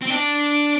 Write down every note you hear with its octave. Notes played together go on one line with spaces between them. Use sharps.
C4
D4